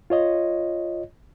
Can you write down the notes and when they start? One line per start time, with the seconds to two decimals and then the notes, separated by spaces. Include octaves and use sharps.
0.10 F4 C#5 D#5